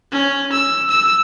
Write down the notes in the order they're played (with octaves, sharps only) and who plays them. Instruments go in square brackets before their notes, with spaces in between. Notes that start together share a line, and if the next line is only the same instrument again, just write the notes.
[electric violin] C#4
E6
E6